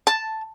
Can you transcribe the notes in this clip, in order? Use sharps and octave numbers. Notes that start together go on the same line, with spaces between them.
A5